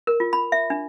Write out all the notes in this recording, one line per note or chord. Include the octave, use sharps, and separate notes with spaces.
A#4
F4
B5
E5
D4